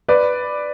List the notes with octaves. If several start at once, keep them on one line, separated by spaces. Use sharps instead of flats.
B4 D5